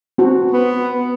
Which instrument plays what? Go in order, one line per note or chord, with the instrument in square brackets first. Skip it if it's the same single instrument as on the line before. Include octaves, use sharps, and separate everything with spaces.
[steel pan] C4 F#4
[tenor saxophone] B3